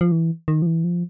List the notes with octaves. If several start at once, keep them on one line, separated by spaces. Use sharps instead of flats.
F3
E3
D#3
F3
E3
F3